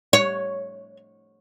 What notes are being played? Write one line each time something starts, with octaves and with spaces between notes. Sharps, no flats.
C#5